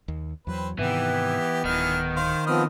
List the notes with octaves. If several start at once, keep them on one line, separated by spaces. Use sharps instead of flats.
D#2
E2 F#3 C4 B4
G#2 C3 D#3 E3 B3 G4
D1 D#3 E3 F6
C5 F5
F3 B3 C4 D#5 B5 F6